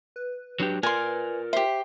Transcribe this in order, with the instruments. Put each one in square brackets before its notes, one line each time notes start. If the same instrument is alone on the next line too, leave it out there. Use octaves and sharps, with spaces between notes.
[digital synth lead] B4
[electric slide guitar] F#3 D4 G4
[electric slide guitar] F4 A#4 D5 [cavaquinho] G#5 C6
[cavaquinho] G4 C5 [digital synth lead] E5